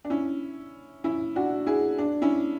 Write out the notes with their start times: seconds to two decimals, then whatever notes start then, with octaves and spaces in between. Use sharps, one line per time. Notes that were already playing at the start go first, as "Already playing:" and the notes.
0.05 D4
0.10 C#4 E4
1.04 C#4 E4
1.36 D4 F#4
1.66 E4 G#4
1.98 D4
2.22 C#4 E4